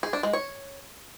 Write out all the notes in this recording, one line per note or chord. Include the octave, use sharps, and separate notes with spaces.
G#4
D4
G#3
C#5